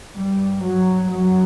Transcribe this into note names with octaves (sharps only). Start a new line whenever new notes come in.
G2 G3
F#3
F#2 F#3